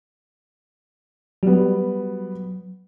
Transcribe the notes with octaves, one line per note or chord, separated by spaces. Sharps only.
F#3 G3 B3